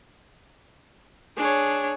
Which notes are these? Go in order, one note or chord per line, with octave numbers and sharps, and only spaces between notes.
D4 G#4 C#5